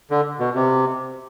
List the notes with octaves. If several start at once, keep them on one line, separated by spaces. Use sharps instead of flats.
D3
B2
C3